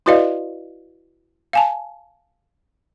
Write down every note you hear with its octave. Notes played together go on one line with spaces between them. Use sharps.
E4 F#4 B4 D5 D#5 F5
F5 G#5 A5